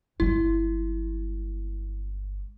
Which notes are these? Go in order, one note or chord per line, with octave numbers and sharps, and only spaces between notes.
G1 G#3 E4